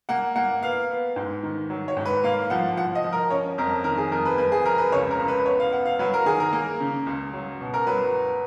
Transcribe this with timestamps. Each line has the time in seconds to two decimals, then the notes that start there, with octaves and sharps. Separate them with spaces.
0.09 A#3 F#5
0.36 A#3 F#5
0.62 B3 F5
0.90 B3
1.16 G#2
1.43 D#3
1.70 F#3
1.88 C#5
1.97 G#2
2.06 B4
2.24 A#3 F5
2.50 F3 F#5
2.77 F3 F#5
2.95 D#5
3.04 F3
3.13 A#4
3.30 C#4 C#5
3.58 F2 A#4
3.84 D#3 A#4
3.98 G#4
4.12 F2 A#4
4.25 B4
4.38 F2 B4
4.52 G#4
4.65 F2 A#4
4.78 B4
4.92 C#2 C#5
5.11 A#4
5.19 C#2
5.28 B4
5.40 B4
5.46 B3 C#5
5.60 F5
5.72 B3 F#5
5.85 F5
5.99 F#3 B4
6.14 A#4
6.26 D#3 G#4
6.40 A#4
6.53 A#3
6.80 C#3
7.06 C#2
7.34 F#3
7.61 B2
7.74 A#4
7.87 F#3 B4